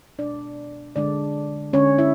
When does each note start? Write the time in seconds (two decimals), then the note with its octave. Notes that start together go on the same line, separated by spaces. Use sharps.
0.19 B2 G#3 D4 D5
0.96 D3 G#3 D4 D5
1.73 D3 G#3 C#4 C#5
1.98 E4 E5